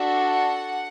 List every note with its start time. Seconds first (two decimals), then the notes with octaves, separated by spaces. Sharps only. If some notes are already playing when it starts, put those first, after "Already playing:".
Already playing: D4 F#4 A4 E5
0.29 F#5